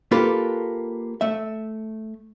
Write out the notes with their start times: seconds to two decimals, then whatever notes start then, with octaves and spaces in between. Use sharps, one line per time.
0.11 A#3 F4 G4 A4 B4
1.21 A3 E5